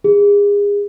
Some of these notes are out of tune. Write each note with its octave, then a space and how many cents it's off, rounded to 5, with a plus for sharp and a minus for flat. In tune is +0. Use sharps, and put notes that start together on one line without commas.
G#4 -35